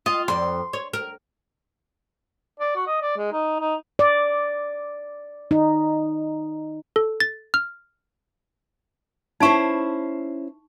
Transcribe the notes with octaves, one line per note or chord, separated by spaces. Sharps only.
F4 D#5
F2 D5 C6
C#5
A#4
D5
F#4
D#5
D5
G#3
D#4
D#4
D5
D#4
A4
A6
F6
C#4 D#4 E4 C5 A5 C#6